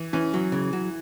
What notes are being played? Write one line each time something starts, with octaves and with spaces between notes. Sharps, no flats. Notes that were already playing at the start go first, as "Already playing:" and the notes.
Already playing: E3
E3 C#4
F#3
C#3
F#3